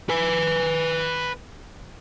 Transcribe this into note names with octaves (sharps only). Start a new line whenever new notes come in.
B4 G#5